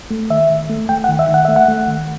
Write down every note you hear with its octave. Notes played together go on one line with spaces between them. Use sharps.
A3
D#3 E5
D#3
A3
A3 G5
F#5
D#3
E5
D#3
F#5
A3 E5
F#5
A3
D#3